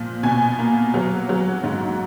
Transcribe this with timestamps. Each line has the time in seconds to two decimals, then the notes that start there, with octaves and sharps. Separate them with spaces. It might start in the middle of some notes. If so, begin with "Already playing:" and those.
Already playing: A#2 F3
0.23 B2 G#5
0.59 A#3
0.94 F#3
1.29 F#3
1.63 G#2